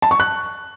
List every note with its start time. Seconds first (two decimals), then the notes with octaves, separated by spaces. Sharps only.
0.02 A5
0.11 C#6
0.20 F#6